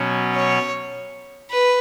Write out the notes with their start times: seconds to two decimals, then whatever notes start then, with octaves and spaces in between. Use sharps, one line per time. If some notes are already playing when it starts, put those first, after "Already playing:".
Already playing: B2 F#3 C#4
0.35 C#5
1.50 B4